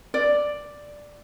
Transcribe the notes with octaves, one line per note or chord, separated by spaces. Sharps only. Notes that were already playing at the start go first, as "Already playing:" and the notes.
D5